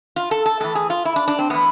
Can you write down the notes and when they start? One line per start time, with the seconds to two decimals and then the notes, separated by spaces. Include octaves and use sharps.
0.16 F4
0.31 A4
0.46 A4
0.60 A2 E3 A4
0.75 G#4
0.90 F4
1.05 E4
1.16 D4
1.28 D4
1.39 C4
1.50 A2 E3 B3